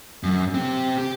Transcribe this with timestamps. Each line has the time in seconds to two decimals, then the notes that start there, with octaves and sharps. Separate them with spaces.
0.23 F#2
0.54 C4 G4
0.98 G4